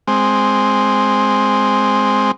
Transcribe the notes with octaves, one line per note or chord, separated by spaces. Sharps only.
G#3 C4